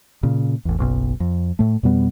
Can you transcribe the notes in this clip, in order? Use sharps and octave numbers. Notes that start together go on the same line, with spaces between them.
A#2 C#3
A1 E2
F#1 B1 B2
F2
A2 A3
F2 B2 G3 B3